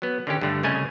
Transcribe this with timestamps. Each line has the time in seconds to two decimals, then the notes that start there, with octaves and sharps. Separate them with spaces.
0.02 F#3 B3
0.27 D3 D#3 C#4 G4
0.41 G2 D3 A3
0.63 C2 C#3 A3 C#4 D#5 G#5